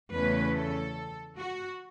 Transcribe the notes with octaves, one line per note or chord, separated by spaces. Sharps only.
E2 C#3 A3 C#4 B4
A4
F#4